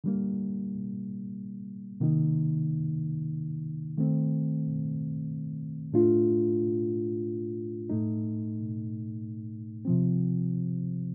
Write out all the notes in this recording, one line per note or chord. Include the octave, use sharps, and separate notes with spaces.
D3 G3 A#3
C3 D#3 A#3 D#4
D#3 A3 C4
A2 A3 D4 F4
A2 A3 D#4
C3 F3 C4